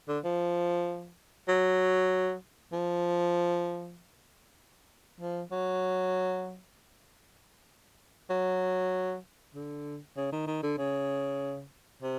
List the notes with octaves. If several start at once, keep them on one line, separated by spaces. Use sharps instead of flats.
D3
F3
F#3
F3
F3
F#3
F#3
D3
C#3
D#3
D#3
D3
C#3
C3